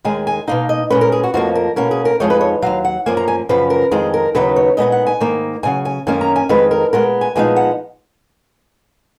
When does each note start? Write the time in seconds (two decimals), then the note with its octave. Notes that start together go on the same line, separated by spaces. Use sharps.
0.05 D#2 D#3 G#3 G#5
0.27 G#5
0.48 B2 A#3 D#4 F5
0.69 D#5
0.90 A#2 G#3 C#4 B4
1.01 A#4
1.12 G#4
1.24 F#4
1.34 F2 F3 A#3 F#4
1.55 A#4
1.76 B2 A#3 C#4 A#4
1.91 G#4
2.05 A#4
2.20 F2 F3 G#3 D#4 C#5
2.30 B4
2.41 C#5
2.62 D#2 D#3 F#3 F5
2.85 F#5
3.06 F#2 F3 A#3 G#5
3.17 A#5
3.28 G#5
3.49 F#2 C#3 F3 B4
3.70 A#4
3.91 F2 D#3 G#3 G#4
4.14 A#4
4.35 D#2 C#3 F#3 B3 D#4 B4
4.56 C#5
4.77 A#2 G#3 B3 D#4 D#5
4.92 F#5
5.07 G#5
5.20 G#2 D#3 A#3
5.63 F#2 C#3 F#3 G#5
5.85 G#5
6.07 F#2 D#3 A#3 C#4 G#5
6.21 A#5
6.36 G#5
6.49 F2 D#3 G#3 B4
6.71 A#4
6.93 A#2 G#3 B3 A#4
7.21 G#5
7.36 A#2 F3 G#3 B3 D#4 G#5
7.56 F#5